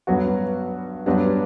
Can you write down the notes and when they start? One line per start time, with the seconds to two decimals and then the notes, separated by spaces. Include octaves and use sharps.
0.07 G2 F#3 B3 F#4
1.06 G2 F#3 B3 D4 G4